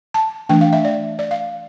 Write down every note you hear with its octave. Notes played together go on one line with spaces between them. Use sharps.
A5
E3 A3 D4 G5
F5
E5
D5
D5
F5